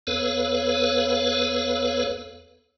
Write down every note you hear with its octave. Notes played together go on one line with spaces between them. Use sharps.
E2 B3 A4 B4 C#5 F5